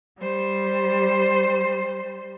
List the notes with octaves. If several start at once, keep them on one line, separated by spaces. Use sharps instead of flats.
G3 C5